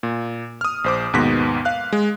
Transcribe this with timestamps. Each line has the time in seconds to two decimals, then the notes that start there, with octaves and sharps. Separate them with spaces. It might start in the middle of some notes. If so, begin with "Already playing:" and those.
0.03 A#2
0.61 D#6 F6
0.84 A#1 C5 D6
1.13 D#2 G#2 B2 B3 A#6 B6
1.65 F5 F#6
1.93 G#3